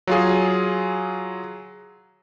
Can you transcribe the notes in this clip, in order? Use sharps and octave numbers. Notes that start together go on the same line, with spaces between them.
F#3 F4 G#4